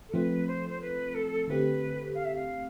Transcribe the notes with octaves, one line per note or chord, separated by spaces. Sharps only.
A4
F3 A3 C4 B4
C5
C5
B4
A4
D3 A3 C4 G4 B4
F5
E5
F5